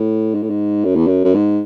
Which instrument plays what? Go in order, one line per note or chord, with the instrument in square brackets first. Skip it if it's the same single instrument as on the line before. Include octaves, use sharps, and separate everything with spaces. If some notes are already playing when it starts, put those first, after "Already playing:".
Already playing: [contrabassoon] A2
G#2
A2
G#2
F#2
E2
F#2
F#2
G#2